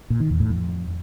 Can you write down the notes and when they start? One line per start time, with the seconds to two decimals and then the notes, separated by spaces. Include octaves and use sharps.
0.10 A#2
0.20 D#3
0.30 E2
0.40 A2
0.50 F2